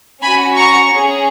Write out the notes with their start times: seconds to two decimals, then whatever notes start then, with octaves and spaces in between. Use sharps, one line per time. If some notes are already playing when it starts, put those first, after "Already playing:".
0.21 C#4 F#4 G#5 B5
0.56 A#5 C#6
0.89 C#4 G#4